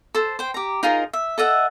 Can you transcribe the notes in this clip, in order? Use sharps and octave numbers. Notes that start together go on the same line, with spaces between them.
A4 C5
C5 G5
G4 A#5
D#4 F4 G#4 A#4
E5
A4 D#5 E5 F#5